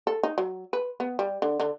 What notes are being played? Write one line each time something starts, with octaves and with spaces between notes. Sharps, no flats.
A4
D#4
F#3
B4
B3
G3
D3
D3